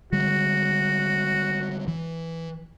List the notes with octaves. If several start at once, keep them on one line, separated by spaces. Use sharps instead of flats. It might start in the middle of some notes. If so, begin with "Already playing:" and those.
D3 G3 G#3 F#4
E3